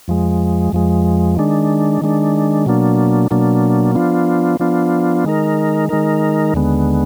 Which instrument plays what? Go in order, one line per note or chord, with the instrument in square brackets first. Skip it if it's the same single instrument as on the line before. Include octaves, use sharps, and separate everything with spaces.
[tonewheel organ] F2 F3 G#3
F2 F3 G#3
D#3 G#3 D4
D#3 G#3 D4
B2 F#3 A#3 D4
B2 F#3 A#3 D4
F3 B3 D4 F4
F3 B3 D4 F4
D#3 G#3 D#4 A#4
D#3 G#3 D#4 A#4
D#2 D3 G#3 B3